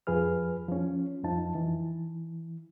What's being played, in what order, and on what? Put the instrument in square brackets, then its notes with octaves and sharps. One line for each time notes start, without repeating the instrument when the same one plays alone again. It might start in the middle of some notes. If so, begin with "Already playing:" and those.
[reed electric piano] F2 F3 G#4 B4 F6
F3 C#4
F2 F3 D#4 A5
E3